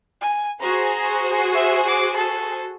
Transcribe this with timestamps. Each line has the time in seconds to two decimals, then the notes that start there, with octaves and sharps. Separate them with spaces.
0.21 G#5
0.61 F#4 G#4 C5 A#5
1.54 E5
1.88 D6
2.16 A4